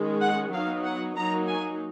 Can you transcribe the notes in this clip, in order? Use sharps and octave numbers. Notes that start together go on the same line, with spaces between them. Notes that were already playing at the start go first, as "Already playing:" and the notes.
Already playing: D#3 G#3 C#4
F#5
F#3 B3 D#4 F5
F#5
F#3 A#3 D#4 A#5
G#5